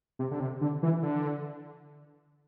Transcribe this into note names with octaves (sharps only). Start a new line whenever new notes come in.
C3
D3
C3
D3
E3
D3